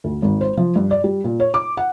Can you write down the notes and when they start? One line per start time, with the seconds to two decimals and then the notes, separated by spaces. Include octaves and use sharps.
0.04 D2
0.22 G#1
0.41 C5
0.57 F3
0.76 G2
0.91 D5
1.04 G3
1.24 A#2
1.40 C#5
1.54 D6
1.77 F#5